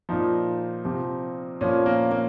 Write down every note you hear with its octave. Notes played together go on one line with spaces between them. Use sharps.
A#2 F3 D#4
C3 F3
A#2 F3 C#4
A#3
A#3